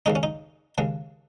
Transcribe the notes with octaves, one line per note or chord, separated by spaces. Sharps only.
D#2 C#3 G#3 D#4
C#4
D#4
D#2 C#3 G#3